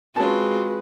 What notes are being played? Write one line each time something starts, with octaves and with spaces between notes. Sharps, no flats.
G#3 C4 C#4 F4 F#4 B4 A5